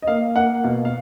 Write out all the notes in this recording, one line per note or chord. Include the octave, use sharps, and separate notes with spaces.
D#5
A#3 F5
A#3 F#5
B2 F5
F5